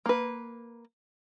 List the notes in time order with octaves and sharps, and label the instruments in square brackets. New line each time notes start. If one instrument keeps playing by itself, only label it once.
[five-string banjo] A#3 B4